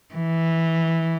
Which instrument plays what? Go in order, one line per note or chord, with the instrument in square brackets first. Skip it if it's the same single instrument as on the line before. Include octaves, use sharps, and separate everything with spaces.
[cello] E3